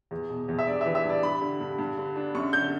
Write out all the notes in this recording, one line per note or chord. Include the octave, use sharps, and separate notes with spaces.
E2
B2
E2
E5
G2 D5
E3 E5
E5
G2 D5
G2 B5
D3
G2
G2
D3
D4
F#2 C#6
D3 G6